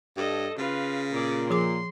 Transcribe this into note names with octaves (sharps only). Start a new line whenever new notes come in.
G2 A4 D#5
C#3 F4 B4
A#2 G#4 D5
F3 G#4 C6 D6